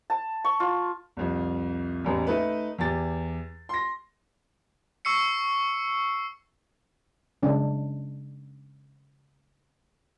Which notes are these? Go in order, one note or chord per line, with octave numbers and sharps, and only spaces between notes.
A5
C#6
F4
C2 F2
A1 E2
A3 D#4 B4
E2 G4 A6
C6 A#6
C#6 E6 C7 C#7
C#3 G#3 D4